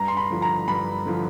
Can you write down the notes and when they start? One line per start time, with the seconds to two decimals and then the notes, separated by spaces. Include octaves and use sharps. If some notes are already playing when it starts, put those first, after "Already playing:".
Already playing: G2 A#5
0.08 C6
0.17 B5
0.30 D3 F3
0.42 A#5
0.68 G2 B5
1.06 D3 F3